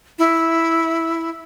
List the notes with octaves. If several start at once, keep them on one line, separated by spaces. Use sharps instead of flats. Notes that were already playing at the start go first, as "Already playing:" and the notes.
E4